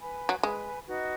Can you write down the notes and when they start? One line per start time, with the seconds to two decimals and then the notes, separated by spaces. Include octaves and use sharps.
0.01 B4 G#5 B5
0.29 F#3
0.43 G#3 B4 G#5 B5
0.87 D#4 F#4 B4 D#5